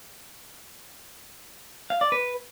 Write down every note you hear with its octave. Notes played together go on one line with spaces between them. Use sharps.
F5
D5
B4